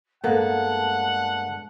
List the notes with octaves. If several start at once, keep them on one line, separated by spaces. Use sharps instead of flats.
G2 G#3 A#3 B3 A4 F#5 A5